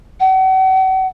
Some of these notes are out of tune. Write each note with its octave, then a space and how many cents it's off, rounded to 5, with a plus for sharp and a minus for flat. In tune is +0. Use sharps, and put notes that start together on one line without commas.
F#5 +40